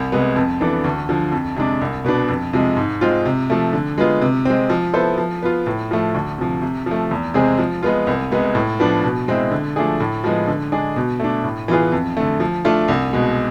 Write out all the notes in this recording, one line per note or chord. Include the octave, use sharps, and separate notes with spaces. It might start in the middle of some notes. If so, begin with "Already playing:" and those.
Already playing: C2
C3 G#3 B3
F2
E3 B3 D4 A4
D2
D3 F3
F2
C3 G#3 D4
C2
B2 B3 D4
F2
C3 F3 G#3
G#2
G#3 C4 F4
C3
F3 A3
D3
G#3 B3 F4
C3
G#3 C4
F3
B3 E4 A4 C5
F3
B3 F4
A2
F3 A3
D2
C3 F3
C3
F3
A3
E2
C3 G#3 C4 G#4
F3
G#3 B3 F4
C2
C3 G#3 B3
A2
F3 B3 D4
B2
G#3 C4 E4
D3
F3 A3 D4 G#4
A2
F3 G#3 B3
D3
G#3 D4 G#4
B2
A3 D4
A2
E3 B3 F4 G#4
F2
D3 A3
F3
A3 D4 F4
C2
B2 G#3